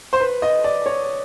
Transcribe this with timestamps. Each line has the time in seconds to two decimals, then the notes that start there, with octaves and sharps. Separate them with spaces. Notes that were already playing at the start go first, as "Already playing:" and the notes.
0.13 C5
0.20 B4
0.42 D#5
0.64 D5
0.86 C#5